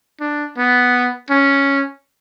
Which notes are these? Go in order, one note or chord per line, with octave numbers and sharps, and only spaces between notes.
D4
B3
C#4